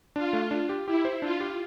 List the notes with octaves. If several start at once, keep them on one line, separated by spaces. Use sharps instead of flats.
D4 F4
A3
D4
G4
E4 G4
C5
D4 F4
G4